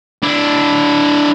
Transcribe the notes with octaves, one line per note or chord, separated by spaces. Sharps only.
D4 E4